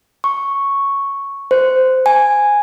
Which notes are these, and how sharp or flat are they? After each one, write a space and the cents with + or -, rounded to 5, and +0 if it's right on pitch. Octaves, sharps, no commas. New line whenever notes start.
C#6 +0
C5 -15
G#5 -5